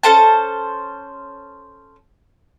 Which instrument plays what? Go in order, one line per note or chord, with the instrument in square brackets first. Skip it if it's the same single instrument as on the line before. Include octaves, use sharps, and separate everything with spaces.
[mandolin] C#4 A4 C5 A5